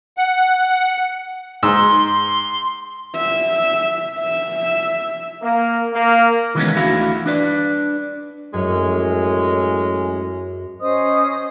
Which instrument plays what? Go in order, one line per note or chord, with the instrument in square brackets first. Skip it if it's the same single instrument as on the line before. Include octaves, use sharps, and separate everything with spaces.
[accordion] F#5
[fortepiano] G#2 E6 [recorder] C6
[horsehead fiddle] E5
E5
[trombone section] A#3
A#3
[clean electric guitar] D#3 E3 G#3 A#3 B3 C#4
D2 D3 E3 E4 F#4 F5
D4 B4 D5
[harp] F#2 [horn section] A2 G#3 C#4
[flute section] C#4 C5 D#5 D#6